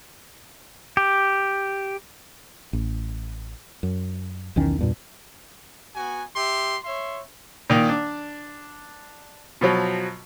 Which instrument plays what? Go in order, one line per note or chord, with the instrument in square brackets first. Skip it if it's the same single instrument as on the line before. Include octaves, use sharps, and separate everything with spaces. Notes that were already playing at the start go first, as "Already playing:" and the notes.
[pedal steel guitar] G4
[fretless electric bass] A1
F#2
B1 E2 D#3 C#4
E2 G2 A#2
[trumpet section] B3 F#4 G#5
G4 E5 C6
C#5 E5 C6
[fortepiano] A#2 D#3
D4
B2 F3 F#3